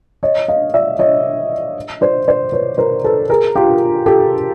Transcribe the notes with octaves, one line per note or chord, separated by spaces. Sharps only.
C#5 D#5
D#5 F5
D5 E5
C#5 D#5
C5 D5
C5 D5
B4 C#5
A#4 C5
A4 B4
G#4 A#4
F4 G4
G4 A4